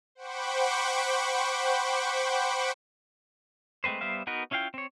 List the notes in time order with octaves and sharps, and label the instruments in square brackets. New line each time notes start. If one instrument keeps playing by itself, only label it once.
[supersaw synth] C5 F#5 G5 B5 C#6 D6
[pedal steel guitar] G#3 A3 C4 B4 C5
G3 B3 C5 E5 F5
B3 D#4 F#4 A#4 B4
C#4 E4 F4 F5 G5
C4 C#5